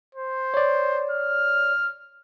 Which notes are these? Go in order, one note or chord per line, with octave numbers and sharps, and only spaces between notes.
C5
C#5 D5
F6